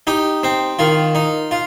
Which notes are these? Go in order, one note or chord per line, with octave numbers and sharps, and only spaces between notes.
D#4 G4
C4
D#3 F4
D#4
F4